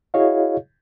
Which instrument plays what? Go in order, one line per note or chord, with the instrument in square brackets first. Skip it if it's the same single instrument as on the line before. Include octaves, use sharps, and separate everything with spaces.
[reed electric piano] E4 F#4 G#4 C#5 D#5 F5